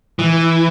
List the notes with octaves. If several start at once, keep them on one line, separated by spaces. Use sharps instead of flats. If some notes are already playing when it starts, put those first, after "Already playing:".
E3